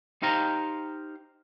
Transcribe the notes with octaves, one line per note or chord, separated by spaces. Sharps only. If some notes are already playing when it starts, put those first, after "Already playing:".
D#4 G4 C5 F5 G5 A#5